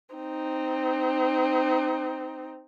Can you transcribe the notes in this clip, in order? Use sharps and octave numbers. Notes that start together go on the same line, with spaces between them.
C4 D#4